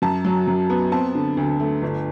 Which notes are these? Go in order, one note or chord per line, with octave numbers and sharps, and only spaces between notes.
F#2 A5
F#3
F#2
B3
C4 A5
D3
D2
A3
G1